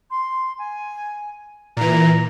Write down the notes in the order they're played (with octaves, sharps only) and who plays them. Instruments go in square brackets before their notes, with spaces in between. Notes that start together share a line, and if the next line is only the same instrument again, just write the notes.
[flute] C6
G#5
[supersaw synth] A#2 E3 [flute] A#5